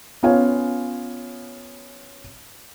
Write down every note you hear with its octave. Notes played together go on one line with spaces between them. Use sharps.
B3 C#4 F4 C#5 F5 G#5